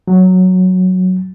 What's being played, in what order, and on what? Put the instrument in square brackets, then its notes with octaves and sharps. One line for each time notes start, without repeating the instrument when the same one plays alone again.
[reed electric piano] F#3